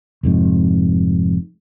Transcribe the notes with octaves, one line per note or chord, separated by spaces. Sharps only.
F1 F2 G#2